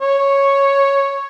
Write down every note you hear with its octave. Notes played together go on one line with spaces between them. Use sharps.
C#5